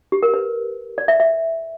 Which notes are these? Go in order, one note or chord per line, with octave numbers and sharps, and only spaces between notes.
G4
A#4
B4
D5
E5
E5